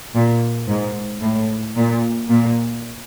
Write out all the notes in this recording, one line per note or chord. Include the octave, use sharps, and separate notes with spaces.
A#2
G#2
A2
A#2
A#2